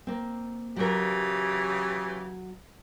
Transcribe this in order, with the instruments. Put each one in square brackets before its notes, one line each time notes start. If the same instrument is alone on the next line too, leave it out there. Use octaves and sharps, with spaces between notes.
[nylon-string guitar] A#3 C4
[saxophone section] C#3 E3 G4 [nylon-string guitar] F#3 A#4